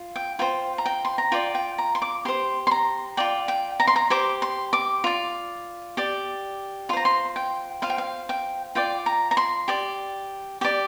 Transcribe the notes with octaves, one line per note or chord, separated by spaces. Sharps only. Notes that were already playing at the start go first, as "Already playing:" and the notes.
Already playing: F4
G5
F4 C5 G5
A#5
G5
C6
A#5
F4 D5 G5
G5
A#5
C6
D6
G4 C5 C6
C6
A#5
F4 D5 G5
G5
A#5
C6
A#5
G4 C5 D6
C6
D6
F4 D5
G4 D5
F4 C5 A#5 C6
C6
G5
F4 C5 F5
G5
F5
G5
F4 D5 G5
A#5
A#5
C6
G4 D5
G4 D5